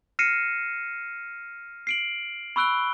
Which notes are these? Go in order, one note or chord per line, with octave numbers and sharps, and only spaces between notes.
F6 A#6 C7 C#7 D#7 E7
C7 D7 F#7
B5 C#6 E6 F#6 D7 G7